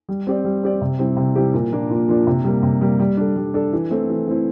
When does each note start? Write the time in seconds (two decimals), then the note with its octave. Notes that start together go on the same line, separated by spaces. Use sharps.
0.09 G3
0.27 C4 G4 D5
0.45 G3
0.63 C4 G4 D5
0.81 C3
0.99 G3 C4 E4 G4
1.17 C3
1.36 G3 C4 E4 G4
1.54 A#2
1.72 F3 A#3 D4
1.90 A#2
2.08 F3 A#3 D4
2.27 C3
2.44 G3 A#3
2.63 C3
2.81 G3 A#3
3.00 G3
3.17 D4 A4
3.36 G3
3.54 D4 A4
3.73 E3
3.91 A3 C4 E4
4.09 E3
4.27 A3 C4 E4